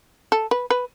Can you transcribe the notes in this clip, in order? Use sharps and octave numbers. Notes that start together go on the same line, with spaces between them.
A4
B4
B4